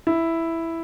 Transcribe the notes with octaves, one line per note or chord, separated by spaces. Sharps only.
E4